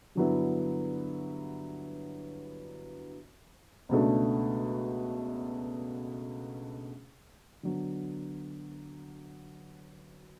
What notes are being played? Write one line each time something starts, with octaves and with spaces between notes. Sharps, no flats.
G2 D3 F#3 B3 E4
C#2 B2 A3 D4
D3 F#3 B3